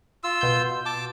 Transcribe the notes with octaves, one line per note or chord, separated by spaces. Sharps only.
F4 E6
B2 G6
A5 D6